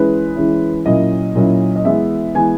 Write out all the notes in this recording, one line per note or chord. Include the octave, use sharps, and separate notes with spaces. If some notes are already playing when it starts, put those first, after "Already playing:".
Already playing: E3 G#3 C#4 E4 B4
E3 G#3 C#4 E4
A#2 F#3 C#4 E4 D#5
A#2 F#3 C#4 E4
D#5
E3 G#3 B3 E5
E3 G#3 B3 G#5